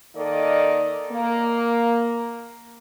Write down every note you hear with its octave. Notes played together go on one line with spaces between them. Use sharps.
D#3 A#3 A4 D5 D#5
A#3